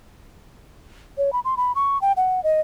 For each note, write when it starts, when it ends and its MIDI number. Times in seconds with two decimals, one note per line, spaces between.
1.18 1.32 73
1.33 1.40 83
1.45 1.55 84
1.57 1.72 83
1.75 2.00 85
2.02 2.12 79
2.17 2.43 78
2.44 2.61 75